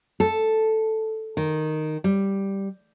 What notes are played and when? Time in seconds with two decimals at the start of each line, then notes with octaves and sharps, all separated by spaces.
0.20 A4
1.37 D#3
2.04 G3